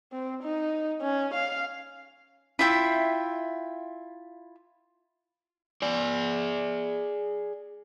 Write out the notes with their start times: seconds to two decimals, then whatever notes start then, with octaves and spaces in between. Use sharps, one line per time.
0.12 C4
0.43 D#4
1.02 C#4
1.34 F5
2.59 E4 F4 E5 G5
5.82 G#4 D5